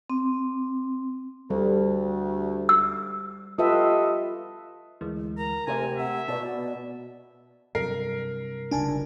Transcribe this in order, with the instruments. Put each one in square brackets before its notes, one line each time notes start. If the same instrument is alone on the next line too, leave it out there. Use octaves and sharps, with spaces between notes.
[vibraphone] C4
[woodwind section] D2 [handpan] G3
[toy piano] E6
[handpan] F4 B4 E5 [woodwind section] G4 A4 D#5
[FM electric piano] D2 E3 G#3
[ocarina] A#4 [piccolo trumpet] A#5
[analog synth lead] C3 [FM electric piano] A3 C5 A#5 [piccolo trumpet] G#5
[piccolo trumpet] E5 [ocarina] F#5
[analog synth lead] B2 [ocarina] D5 [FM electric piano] A5
[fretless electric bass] G2 C3 F#3 [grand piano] A#4 [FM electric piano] C7
[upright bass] F#1 C#2 [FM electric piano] D4 G#5 A5